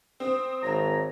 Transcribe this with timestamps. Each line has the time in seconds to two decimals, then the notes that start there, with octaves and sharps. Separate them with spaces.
0.20 C4 D#6
0.63 G#1 C#5 A#5